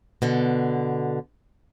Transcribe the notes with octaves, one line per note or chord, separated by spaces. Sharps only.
B2 D3